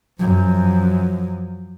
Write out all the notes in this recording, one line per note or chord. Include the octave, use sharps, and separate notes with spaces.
F#2 F3